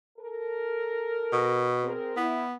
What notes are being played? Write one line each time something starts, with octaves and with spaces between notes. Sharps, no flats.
A4 A#4
B2
C4 G#4 A#4
B3 E4